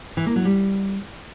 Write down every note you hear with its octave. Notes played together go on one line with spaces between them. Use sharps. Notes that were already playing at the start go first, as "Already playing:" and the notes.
E3
A#3
F#3
G3